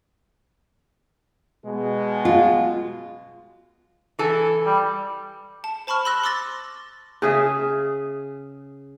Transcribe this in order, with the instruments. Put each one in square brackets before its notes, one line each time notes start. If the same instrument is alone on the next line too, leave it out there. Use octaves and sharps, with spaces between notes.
[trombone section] B2 G#3
[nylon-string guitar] F4
[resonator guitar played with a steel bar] E3 A4 G#5
[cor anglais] G3
[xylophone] A5
C5 A5 B5 C#6 F6
B5 C6 E6 F#6 A#6
C6 D6 E6 A6 A#6
[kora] C#3 G#4 E5